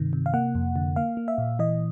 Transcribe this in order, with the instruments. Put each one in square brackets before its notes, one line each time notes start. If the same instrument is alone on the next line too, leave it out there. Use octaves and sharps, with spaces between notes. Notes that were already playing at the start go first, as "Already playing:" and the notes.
Already playing: [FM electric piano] G2 C3 D#3
C3
F5
A#3 F#5
F2
D3
A#3 F5
A#3
E5
A#2
E3 D#5